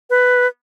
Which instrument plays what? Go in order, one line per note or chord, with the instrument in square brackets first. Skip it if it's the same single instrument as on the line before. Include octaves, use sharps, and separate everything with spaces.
[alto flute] B4